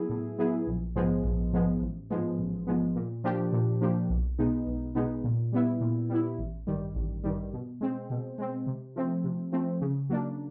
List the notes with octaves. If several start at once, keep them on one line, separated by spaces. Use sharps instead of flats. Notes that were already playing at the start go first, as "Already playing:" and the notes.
Already playing: F#3 B3 E4 G#4
A2
F#3 B3 E4 G#4
A#1
G#2 F3 G#3 B3
A#1
G#2 F3 G#3 B3
A1
G#2 F3 G#3 B3
A1
G#2 F3 G#3 B3
A#2
F3 A#3 D4 G4
A#2
F3 A#3 D4 G4
B1
B2 G#3 B3 D#4
B1
B2 G#3 B3 D#4
A#2
G3 B3 E4
A#2
G3 B3 E4
A1
G2 D#3 G3
A1
G2 D#3 G3
B2
G#3 C4
B2
G#3 C4
C3
F3 A3 C4
C3
F3 A3 C4
C#3
F#3 A#3 D4